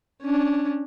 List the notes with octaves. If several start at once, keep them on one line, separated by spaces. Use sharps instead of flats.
C#4 D4